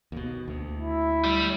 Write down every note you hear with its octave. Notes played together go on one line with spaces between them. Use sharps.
D#2 B2
D2
E4
G3